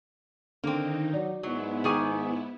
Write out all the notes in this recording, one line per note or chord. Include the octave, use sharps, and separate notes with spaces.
D3 D#3 A#3 C4 D#4
F#3 D5
G#2 F#3 B3 E4
D#3 G#4 G#5 C#6 D6